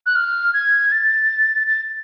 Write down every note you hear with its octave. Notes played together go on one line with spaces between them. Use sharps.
F#6
F6
G#6
A6
A6